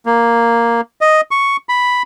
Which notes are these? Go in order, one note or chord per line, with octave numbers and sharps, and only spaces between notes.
A#3
D#5
C#6
B5